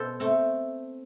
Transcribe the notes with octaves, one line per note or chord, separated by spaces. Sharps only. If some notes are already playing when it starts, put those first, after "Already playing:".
Already playing: B2 A4 C5
A3 C4